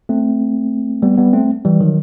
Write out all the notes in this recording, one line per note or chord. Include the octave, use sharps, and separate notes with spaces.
A3 C4
G3 B3
G3 B3
A3 C4
E3 G3
D#3 F#3